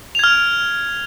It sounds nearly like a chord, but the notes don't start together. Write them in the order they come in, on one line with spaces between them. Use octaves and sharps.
F7 G#6 F6